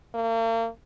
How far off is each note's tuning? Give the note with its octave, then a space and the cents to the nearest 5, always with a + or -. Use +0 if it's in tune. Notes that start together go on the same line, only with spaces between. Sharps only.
A#3 -40